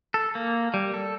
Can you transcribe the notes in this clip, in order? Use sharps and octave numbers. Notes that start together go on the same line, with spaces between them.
A4
A#3
G3
A4